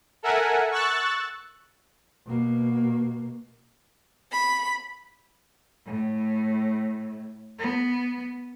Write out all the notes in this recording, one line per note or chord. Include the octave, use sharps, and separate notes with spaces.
A4 A#4 E5 F#5 G#5
C#6 E6 F#6 A6
B2 A#3
B5
A2
B3